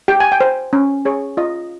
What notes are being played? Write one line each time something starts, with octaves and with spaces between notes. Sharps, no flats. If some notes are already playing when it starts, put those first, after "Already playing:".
G4 G5
G#5
G5
C5
C#4
G#4 C#5
F4 D#5